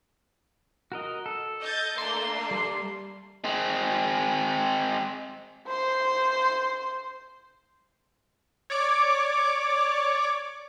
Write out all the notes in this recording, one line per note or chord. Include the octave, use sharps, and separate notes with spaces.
F#4 A#4 D#5
A4
D#5 G6 A6
A3 A#3 D4 C6
G3
G#3 C4
C5 C6
C#5 D5 D6